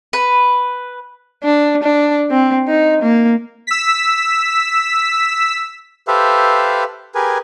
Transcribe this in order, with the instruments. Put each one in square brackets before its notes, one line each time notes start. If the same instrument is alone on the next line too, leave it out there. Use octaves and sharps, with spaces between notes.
[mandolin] B4
[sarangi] D4
D4
C4
D#4
A#3
[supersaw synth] E6 B6
[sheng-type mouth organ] G4 A4 B4 C5 E5 F5
G4 G#4 A#4 B4 G#5